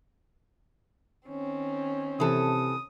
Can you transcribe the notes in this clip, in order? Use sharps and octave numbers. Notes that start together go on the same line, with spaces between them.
D#3 C4 C#4
C3 E3 A4 D#6